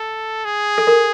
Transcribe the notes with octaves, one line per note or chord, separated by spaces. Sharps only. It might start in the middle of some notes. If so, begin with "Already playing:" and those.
Already playing: A4
G#4
A4
A#4